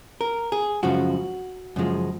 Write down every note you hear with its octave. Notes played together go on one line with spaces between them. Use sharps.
A#4
G#4
F#2 C#3 F3 G#3 F#4
F#2 C#3 F3 G#3